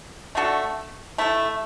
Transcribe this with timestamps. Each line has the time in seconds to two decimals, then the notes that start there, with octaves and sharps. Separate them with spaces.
0.35 A3 D4 F#4 A4
1.18 A3 E4 A4